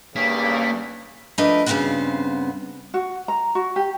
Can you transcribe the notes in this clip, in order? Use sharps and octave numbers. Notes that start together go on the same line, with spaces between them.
E2 G2 C#3 A#3 B6
F3 A3 D4 A#4 B4 D#5
G2 C#3 A3 B3 C4 F#4
F#4
A#5
F#4
G4